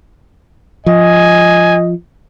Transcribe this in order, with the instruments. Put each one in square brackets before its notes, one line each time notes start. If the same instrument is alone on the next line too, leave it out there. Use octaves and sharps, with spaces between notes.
[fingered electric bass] F3 [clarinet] D#5 [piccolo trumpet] G#5